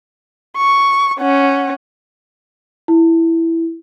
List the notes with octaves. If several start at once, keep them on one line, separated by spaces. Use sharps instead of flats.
C#6
C#4 F#5
E4